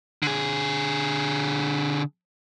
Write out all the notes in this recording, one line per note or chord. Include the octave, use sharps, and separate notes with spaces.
D3 G#4